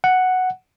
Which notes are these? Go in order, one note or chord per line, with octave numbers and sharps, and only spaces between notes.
F#5